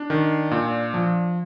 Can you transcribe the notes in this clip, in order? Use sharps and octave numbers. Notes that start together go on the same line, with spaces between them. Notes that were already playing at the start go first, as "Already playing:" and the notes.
Already playing: D4
D#3
A#2
F3